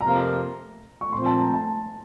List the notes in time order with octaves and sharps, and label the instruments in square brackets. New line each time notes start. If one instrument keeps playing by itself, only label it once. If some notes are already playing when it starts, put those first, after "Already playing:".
[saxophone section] F2 C3 F3 A#3 F4 [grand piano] A#5
[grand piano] C#6
[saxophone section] A#2 F3 C4 [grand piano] C6
[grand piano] A5
A#5
A5